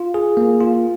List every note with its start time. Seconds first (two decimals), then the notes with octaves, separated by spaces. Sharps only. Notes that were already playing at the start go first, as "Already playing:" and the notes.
Already playing: F4
0.14 G#4
0.37 A#3
0.61 F4